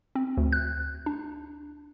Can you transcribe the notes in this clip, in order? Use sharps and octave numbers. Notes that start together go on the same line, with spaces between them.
C4
D2
F#6
D4